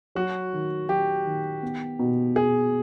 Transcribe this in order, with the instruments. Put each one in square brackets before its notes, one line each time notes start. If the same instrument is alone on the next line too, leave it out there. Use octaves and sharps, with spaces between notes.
[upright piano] F#3 [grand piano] F#4
[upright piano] D#3
[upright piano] F#3 [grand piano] G4
[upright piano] D#3
B3
B2
[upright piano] B2 [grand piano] G#4